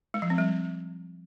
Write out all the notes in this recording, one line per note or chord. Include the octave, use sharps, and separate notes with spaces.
G#3
F3
C4
G3